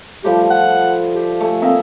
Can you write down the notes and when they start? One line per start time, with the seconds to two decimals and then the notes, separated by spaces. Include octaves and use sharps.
0.24 F3 G3 A3 G4
0.50 F#5
1.14 G4
1.40 A3 G#5
1.62 A#3 C4 D#5 E5